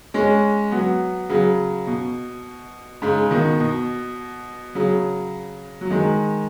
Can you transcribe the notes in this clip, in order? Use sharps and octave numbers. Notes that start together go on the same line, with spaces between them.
G#3 C#4
F#3 B3
C#3 F#3
B2
G#2 C#3
B2 D#3
B2
C#3 F#3
F#3
D#3 G#3